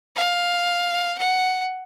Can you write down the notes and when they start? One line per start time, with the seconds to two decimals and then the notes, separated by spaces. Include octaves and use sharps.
0.16 F5
1.18 F#5